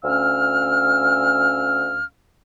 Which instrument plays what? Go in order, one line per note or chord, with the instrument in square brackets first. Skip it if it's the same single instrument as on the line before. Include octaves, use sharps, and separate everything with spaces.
[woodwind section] D2 C#4 F5 E6 F6